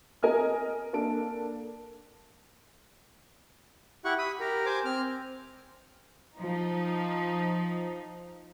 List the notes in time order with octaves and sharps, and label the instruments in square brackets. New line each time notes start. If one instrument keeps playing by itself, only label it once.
[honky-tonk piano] A#4 D#5 G#5 F6
A#3 D4 A4 D7
[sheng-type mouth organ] E4 G4 F#5 C#6
B5 D#6
G4 A#4
C5 G#5 D6
C4 F6
[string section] F3 D#4